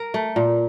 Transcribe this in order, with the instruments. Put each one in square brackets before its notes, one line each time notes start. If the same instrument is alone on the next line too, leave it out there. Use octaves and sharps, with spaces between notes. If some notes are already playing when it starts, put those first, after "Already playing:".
Already playing: [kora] A#4
A3
A#2